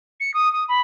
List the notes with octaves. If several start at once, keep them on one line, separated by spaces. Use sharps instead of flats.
C#7
D#6
D#6
B5